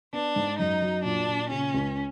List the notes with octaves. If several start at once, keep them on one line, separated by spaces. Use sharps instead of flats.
B3 D4
G#2
F#2 D#4
F#3
A#2 D4
A#2
C#3 C#4
C#2